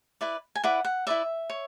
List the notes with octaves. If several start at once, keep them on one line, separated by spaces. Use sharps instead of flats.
E4 B4 D5
G#5
E4 B4 D5 F#5
F#5
E4 B4 D5 E5
C#5